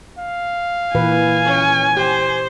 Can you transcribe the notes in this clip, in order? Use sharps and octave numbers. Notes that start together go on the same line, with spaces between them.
F5
A#2 E3 B4 G#5
C#4
G4 C5